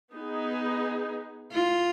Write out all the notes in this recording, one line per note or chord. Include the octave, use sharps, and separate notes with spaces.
B3 D#4 G#4
F4